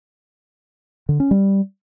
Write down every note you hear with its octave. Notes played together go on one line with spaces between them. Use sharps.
D3
C#4
G3